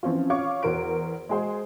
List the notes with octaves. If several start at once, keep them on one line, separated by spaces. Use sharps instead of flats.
E3 F3 C4 C#4 F4
F4 C#5 F5 C#6 D6
E2 F#4 A#4 C5 D7
G#3 F#4 G#4 C5